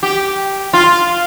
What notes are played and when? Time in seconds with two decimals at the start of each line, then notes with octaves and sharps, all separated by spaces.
0.03 G4
0.73 F4